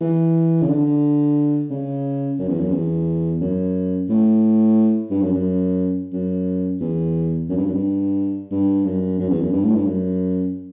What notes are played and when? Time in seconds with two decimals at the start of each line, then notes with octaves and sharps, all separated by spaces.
0.01 E3
0.62 C#3
0.69 D3
1.70 C#3
2.39 F#2
2.49 E2
2.59 F#2
2.72 E2
3.41 F#2
4.09 A2
5.10 G2
5.22 F#2
5.33 F#2
6.13 F#2
6.81 E2
7.49 F#2
7.57 G2
7.66 F#2
7.74 G2
8.51 G2
8.85 F#2
9.19 F#2
9.30 E2
9.41 F#2
9.53 G2
9.64 A2
9.76 G2
9.86 F#2